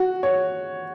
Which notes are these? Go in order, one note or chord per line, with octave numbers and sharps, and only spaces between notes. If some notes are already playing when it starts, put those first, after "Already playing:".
Already playing: F#4
C#5